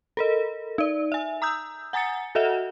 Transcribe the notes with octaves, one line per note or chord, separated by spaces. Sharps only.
A4 A#4 D#5
D#4 D5
E5 G#5
A#5 D#6 E6 G6
F#5 G#5 A#5 D#6 A6 C#7
F#4 A4 D#5 E5 F#5